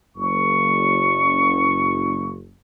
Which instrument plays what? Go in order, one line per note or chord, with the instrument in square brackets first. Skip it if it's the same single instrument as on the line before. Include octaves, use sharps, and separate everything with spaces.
[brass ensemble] F#1 [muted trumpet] C#6